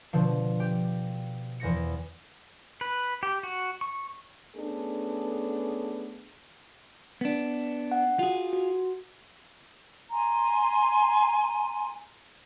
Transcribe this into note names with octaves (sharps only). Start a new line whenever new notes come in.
B2 D3 F3
G4 G5
E2 F3 A#6 C#7
B4
G4
F#4
C#6
A3 B3 C#4 D4 G#4 A4
B3 D4
F#5
F4 F#4 G#4
F#4
G#5 A#5 C6